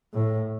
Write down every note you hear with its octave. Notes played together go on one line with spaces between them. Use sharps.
A2